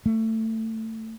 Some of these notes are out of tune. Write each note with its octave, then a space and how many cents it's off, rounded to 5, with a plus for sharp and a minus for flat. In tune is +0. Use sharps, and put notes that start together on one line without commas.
A3 +20